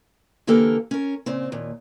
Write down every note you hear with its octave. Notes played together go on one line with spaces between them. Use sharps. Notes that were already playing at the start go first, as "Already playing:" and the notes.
D3 E3 A#3 G4 A4 A#4
C#4 A#4
A#2 C#3 C4
D#2 A#2